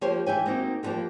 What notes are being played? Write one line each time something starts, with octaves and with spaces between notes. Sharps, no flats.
F3 A#3 G4 C5 C#5
E3 E4 G5 G#5
A#3 C4 D#4 F#4
D3 E3 F3 G3 A#3